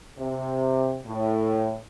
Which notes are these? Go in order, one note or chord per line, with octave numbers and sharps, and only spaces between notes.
C3
A2